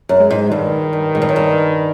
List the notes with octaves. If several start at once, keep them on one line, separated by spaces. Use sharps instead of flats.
F#2
G#3
G#2
G2 D#3
G2
G#2
G2
F#2
G2